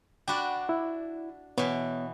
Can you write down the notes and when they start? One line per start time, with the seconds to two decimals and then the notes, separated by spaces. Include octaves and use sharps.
0.28 D4 F#4 D5 G5 B5
0.69 E4
1.58 B2 E3 B3 C#5